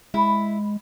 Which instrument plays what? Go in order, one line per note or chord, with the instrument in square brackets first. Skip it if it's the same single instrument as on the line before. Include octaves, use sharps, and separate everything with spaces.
[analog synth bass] G#3 [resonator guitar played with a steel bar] E4